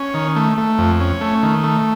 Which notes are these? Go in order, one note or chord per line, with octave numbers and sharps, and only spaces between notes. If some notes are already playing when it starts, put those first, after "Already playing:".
Already playing: C#4
D#3
A3
A3
F2
C#4
A3
D#3
A3